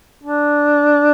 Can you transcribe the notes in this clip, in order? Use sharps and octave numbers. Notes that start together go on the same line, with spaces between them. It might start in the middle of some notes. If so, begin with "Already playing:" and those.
D4